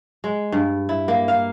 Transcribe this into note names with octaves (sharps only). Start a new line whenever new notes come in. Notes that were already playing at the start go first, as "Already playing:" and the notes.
G#3
G2
E4
A#3
F5